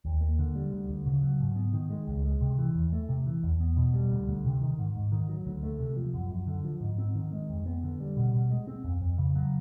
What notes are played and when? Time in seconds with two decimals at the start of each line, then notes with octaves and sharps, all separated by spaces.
0.05 D#2
0.21 A#3
0.39 D3
0.55 G3
0.72 D2
0.89 D2
1.06 C#3
1.22 F#3
1.40 G#2
1.56 B3
1.73 D#3
1.90 G#3
2.08 C#2
2.25 G#3
2.41 C3
2.58 E3
2.75 E2
2.92 A3
3.09 C3
3.26 E3
3.43 E2
3.60 B3
3.77 B2
3.94 G3
4.11 D2
4.28 D2
4.45 C3
4.61 D#3
4.78 G#2
4.95 G#2
5.12 D#3
5.29 F#3
5.45 D2
5.63 A3
5.80 C3
5.96 F3
6.14 F#2
6.31 F#2
6.47 D3
6.64 F3
6.81 G#2
6.98 C4
7.15 D#3
7.32 G#3
7.49 F2
7.66 B3
7.83 D3
8.00 G3
8.17 B2
8.33 B2
8.50 G#3
8.67 C4
8.84 F2
9.01 F2
9.18 C#3
9.35 F#3